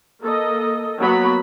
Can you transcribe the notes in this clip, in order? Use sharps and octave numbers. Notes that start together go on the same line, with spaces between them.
A#3 A4 D#5
F#3 A#3 B3 F#4 B5